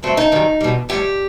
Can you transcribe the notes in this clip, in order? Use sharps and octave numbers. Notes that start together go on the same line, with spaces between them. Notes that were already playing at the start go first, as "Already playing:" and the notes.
G2 F#3 A3 C4
D#4
F#2 D#3 G3
B2 G3
A2 G3 G4